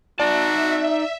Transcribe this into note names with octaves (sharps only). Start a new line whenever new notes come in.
D#4 F#4 D5 E5 A5